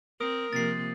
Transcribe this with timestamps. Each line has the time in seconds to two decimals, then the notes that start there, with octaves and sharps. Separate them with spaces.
0.20 C4 A#4 D#6
0.53 C3 F3 A#3 A6 C7